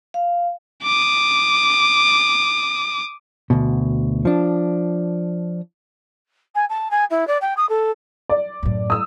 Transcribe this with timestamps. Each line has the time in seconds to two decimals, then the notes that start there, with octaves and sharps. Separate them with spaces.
0.14 F5
0.83 D6 D#6
3.50 D2 B2
4.25 F3 D4
6.55 G#5
6.69 A5
6.90 G#5
7.10 E4
7.27 D5
7.41 G5
7.57 D#6
7.69 A4
8.29 D5
8.63 F#2 A2
8.90 D#6 E6